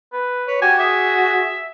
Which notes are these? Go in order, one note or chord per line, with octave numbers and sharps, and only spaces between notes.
B4
B4 C#5
F#4 G4 G#5
G#4 E5